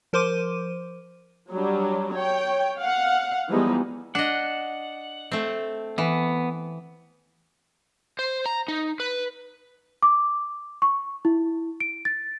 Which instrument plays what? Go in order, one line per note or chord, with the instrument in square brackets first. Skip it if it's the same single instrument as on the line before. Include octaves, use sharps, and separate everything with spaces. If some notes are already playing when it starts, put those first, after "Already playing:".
[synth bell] F3 A#4 C5 C6 D6 D#7
[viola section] F#3 G3 D4
C#5 G5
F5 F#5
E3 F3 G3 G#3 B3 D#4
[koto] D4 D#5 [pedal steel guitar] F#5
[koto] A3 C4
[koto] E3 [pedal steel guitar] B3
[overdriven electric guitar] C5
A#5
D#4
B4
[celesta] D6
C#6
E4
D7
A6